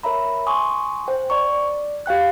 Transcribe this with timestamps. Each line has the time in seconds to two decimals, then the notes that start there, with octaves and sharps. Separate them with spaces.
0.03 A#4 C#5 E5 A#5 B5
0.46 G#5 C6 C#6 D#6
1.08 C5 G5
1.30 D5 A#5 C#6
1.52 D5
2.06 G4 F5 G5 F#6